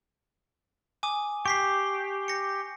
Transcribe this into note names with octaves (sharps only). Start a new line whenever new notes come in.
G#5 D6 D#6
G4 C#6 B6 C7
A#6 C#7